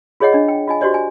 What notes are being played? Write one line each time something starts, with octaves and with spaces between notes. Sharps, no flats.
F4 G#4 C#5 D#5 F#5
D4 D#5
G5
F4 D#5 G#5
F#4 G4 C5 D5 D#5
G#5